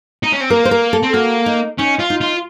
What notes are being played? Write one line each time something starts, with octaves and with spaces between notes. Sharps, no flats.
D#4
C#4
C4
A#3 A#4
C5
A#4
A4
C4
A#3 F#4
D#4
C#4 D#4
F4
D#4
F4